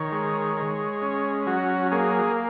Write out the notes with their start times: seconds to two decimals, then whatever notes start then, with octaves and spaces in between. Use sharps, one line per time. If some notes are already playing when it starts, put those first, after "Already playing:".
Already playing: D#3 C#5
0.12 G#3
0.57 G#3
1.02 C#4
1.47 F#3 F#4
1.92 A#3 G#4